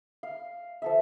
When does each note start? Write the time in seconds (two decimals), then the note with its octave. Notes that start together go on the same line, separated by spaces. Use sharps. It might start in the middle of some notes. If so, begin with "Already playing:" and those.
0.23 F5
0.82 F3 A4 E5